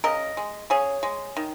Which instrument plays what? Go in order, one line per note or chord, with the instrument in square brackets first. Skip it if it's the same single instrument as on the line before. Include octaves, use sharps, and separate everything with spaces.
[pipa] C#3 A#4 D#5
G#3
C#3 G#4 C#5
G#3
D#3